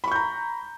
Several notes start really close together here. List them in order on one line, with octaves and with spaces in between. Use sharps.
B5 C#6 G6 A#5